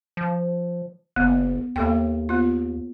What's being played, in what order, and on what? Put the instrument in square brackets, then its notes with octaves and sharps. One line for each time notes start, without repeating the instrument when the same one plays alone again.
[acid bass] F3
[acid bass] F#1 [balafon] B3
[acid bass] D#2 [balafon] A#3 A4 G5
[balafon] B3 F4